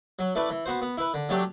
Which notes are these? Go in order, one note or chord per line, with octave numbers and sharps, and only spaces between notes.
F#3
A3 E4 B4 D5
E3
B3 F#4 C5
B3
E4 B4
D3
F#3 A3 D4 G4